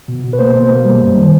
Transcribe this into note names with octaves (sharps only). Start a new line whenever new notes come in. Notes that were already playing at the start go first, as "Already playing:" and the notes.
B2
B2
B4
A#3 C5
B2
A#3
G3
F#2
D#3